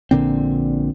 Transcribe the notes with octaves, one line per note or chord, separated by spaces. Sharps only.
A#1 A#2 D3 C4